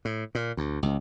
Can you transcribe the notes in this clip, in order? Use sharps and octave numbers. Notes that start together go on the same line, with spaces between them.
A2
A#2
D2
C#2